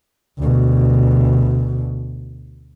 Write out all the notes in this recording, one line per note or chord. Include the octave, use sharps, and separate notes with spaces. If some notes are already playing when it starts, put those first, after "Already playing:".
D2 B2